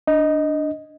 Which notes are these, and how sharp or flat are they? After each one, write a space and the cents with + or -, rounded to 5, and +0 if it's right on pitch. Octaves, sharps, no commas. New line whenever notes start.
D4 +0 D#5 +0